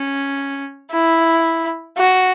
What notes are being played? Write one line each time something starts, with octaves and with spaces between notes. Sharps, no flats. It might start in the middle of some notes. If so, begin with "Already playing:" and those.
Already playing: C#4
E4
F#4